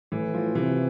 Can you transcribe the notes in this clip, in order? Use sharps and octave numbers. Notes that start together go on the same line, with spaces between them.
A2 E3
F3
C3 E3